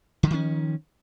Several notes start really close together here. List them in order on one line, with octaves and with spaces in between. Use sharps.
D3 F3 D#3 C#4